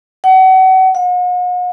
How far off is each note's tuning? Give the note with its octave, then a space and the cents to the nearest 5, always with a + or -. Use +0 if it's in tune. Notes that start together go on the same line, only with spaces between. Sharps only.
F#5 +35
F#5 -45